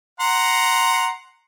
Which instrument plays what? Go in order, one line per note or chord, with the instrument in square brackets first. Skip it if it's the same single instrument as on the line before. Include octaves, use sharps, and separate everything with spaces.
[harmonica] F#5 A#5 C6